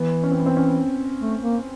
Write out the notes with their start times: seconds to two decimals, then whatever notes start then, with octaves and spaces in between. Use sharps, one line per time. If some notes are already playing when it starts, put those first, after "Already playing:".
Already playing: E3 B3
0.23 C#4
0.31 C4
0.40 B3
0.46 C4
0.57 C#4
1.21 A3
1.42 A#3